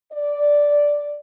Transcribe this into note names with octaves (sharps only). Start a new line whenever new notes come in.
D5